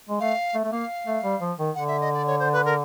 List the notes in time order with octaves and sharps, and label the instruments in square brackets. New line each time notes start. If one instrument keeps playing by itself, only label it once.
[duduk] G#3
[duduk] A3 [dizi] F5
[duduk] A3
A3
[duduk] A#3 [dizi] F5
[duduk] A3
G3
F3
D#3
[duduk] D3 [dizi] F#5
[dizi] E5
D#5
D5
C#5
C5
B4
A#4